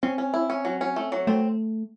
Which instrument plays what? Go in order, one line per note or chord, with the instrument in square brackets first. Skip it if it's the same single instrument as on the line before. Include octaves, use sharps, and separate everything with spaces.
[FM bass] C4 [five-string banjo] C#4
[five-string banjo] C#4
E4
C#4
F#3
C#4
A3
F#3
[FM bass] A3 [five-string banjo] C4